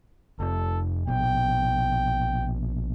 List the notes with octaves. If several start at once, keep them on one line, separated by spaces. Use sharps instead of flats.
F1 A4
A#1 B2 G5